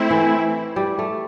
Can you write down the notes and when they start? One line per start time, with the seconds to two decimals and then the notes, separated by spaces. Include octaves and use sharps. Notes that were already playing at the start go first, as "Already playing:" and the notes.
Already playing: A3 C4 E4
0.11 E3
0.76 G3
0.99 A3